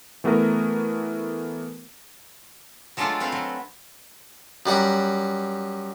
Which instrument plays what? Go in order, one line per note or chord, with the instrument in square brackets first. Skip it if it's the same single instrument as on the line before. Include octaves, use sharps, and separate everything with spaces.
[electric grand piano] E3 A3 B3 F#4 A#4
[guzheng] F#3 G#3 A3 D4 F4 A4
C4 A4 B4 F5
F#3
[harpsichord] F#2 G3 F#5 A#5